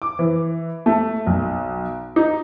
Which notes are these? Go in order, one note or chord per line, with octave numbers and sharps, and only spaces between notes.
D6
E3
A3
B1
D#4